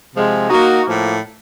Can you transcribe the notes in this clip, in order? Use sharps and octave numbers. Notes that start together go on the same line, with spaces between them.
C3 F3 G#3
A#3 D#4 F#4
A2 F3 A#3